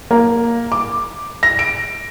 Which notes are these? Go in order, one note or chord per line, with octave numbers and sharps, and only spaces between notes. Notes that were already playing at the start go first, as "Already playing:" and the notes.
A#3
D6
A#6
D7